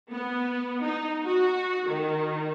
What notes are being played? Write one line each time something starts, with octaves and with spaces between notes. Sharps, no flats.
B3
D#4
F#4
D#3